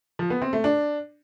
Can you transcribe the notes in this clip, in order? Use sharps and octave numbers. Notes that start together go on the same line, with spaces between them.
F3
B3
C4
A3
D4